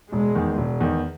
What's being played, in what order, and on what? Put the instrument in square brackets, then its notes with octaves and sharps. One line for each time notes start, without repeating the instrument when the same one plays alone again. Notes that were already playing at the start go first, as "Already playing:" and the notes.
[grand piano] E1 [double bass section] G#3
[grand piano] E2 D#3
E1
E2 D#3